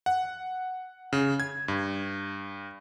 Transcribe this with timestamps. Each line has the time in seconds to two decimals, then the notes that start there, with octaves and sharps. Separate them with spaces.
0.06 F#5
1.13 C#3
1.40 G#6
1.68 G2